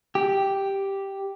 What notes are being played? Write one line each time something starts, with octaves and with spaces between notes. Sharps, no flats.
G4